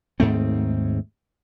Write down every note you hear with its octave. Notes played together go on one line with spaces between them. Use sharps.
D#2 G#2 A3 C4